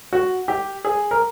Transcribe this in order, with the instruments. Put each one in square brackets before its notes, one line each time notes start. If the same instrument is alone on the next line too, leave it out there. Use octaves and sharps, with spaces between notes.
[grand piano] F#4
G4
G#4
A#4